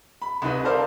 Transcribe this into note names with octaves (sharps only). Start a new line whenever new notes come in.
B5
C2 D#4 B4
A4 A#4 C5 D5 F5